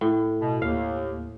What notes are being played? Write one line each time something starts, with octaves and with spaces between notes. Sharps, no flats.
A2
B2
D#2 F5